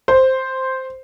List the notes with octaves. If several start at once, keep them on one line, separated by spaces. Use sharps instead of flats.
C5